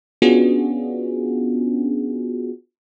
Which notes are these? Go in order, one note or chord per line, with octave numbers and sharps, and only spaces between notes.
B3 C#4 D4 F4 F#4 G#4